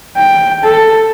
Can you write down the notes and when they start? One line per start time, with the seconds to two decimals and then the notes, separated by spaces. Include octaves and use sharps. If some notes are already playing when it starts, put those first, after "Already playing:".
0.17 G5
0.64 A4